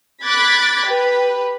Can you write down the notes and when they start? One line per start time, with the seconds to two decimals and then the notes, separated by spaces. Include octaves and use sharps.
0.23 B5 D6 F#6 G#6 A6 B6
0.84 G4 B4